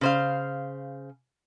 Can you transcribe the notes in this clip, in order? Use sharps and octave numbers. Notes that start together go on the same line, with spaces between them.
C#3 C5 F5